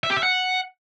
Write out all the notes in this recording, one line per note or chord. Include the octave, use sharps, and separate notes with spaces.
E5
G4
E5
F#5